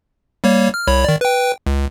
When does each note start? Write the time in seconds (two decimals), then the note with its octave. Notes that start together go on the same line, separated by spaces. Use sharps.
0.44 G3 A#3 C#5
0.74 F6
0.87 C2 C#5 B5
1.04 D#3 D5
1.21 B4 G5
1.66 C#2